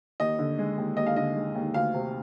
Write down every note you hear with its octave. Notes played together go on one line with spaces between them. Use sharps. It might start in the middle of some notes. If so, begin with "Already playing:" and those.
D#2 D#5
D3
G#3
D#2
D#2 D#5
F5
D3 D#5
G#3
D#2
D2 F5
C3